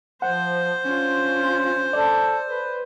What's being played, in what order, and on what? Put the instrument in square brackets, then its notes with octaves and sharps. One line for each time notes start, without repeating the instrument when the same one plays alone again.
[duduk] F3 [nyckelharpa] C5 [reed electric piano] F#5
[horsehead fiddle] C#4 D4 [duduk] F4
[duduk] A4 [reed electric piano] D5
[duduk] B4